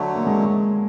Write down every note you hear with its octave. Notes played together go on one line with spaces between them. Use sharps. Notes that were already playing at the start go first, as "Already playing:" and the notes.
Already playing: D3 F#3 A3
A#3
G#3